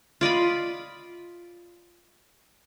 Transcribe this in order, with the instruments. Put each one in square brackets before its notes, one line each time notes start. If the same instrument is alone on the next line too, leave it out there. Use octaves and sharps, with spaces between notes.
[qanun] F4 D5 D#5 B5